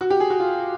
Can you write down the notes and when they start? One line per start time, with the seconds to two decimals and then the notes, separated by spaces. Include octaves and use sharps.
0.01 F#4
0.10 G4
0.20 G#4
0.30 F#4
0.40 F4